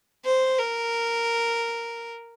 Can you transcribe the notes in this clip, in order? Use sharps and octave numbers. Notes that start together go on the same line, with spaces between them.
C5
A#4